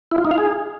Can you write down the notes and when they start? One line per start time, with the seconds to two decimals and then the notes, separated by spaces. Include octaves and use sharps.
0.12 E4
0.18 F4
0.25 D#4
0.31 F5
0.38 G#4